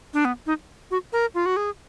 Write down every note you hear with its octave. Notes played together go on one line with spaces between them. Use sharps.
D4
B3
D#4
F#4
A#4
F4
F#4
G#4